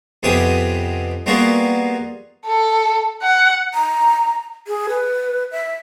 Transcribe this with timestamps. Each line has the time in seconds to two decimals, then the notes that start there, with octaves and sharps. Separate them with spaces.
0.23 F2 C3 B3 G4 G#4 D#6
1.26 G3 A#3 B3 F4 F#4 G#4
2.46 A4
3.23 F#5
3.74 A#5
4.67 G#4
4.89 B4
5.52 E5